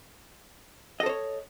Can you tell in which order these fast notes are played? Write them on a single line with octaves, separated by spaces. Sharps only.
D#5 A4 C5 C#5